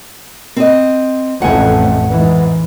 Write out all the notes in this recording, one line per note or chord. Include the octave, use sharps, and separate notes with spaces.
C4 D#5
A1 F2 A3 F#5 G#5
G#2 E3